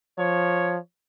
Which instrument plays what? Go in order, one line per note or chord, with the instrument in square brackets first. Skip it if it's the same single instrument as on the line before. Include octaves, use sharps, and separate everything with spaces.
[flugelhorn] F3 [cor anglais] C#5